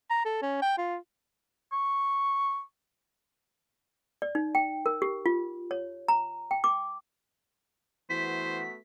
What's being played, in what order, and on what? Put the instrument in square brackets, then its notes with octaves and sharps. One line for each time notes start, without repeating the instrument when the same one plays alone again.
[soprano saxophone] A#5
A4
C#4
G5
F4
[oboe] C#6
[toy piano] D5
D#4
G5
A#4
G4
F4
C#5
A#5
G5
D6
[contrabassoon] E3 [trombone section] A3 B3 F#4 [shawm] C5 [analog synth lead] B6